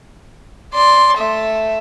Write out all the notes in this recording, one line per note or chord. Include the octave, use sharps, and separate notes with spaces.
D5 C6
A3 E5